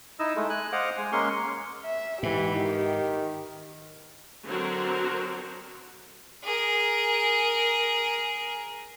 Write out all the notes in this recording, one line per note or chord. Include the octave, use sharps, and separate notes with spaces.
D#4 E4 D#5 E6
G#3 A3
G#5 F#6
C5 D#5 F5 F#5 D6
G#3 G#5
G#3 A#3 C#4 C6 C#6
E5
G#2 E3 G4
D#3
D3 F#3 C4 F#4 A#4 C5
G#4 A#4